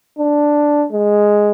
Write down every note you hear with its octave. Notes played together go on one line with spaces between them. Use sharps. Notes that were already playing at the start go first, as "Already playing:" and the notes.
D4
G#3